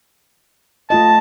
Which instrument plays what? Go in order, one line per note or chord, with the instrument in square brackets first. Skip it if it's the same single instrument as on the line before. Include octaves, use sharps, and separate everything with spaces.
[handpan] A3 F4 D#5 [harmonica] A5